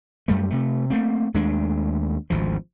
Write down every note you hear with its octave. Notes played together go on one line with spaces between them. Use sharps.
F#2 G3 A3
C3 A3
A3 A#3 C4
D#2 G#3 A3 D4
G#1 D2 F3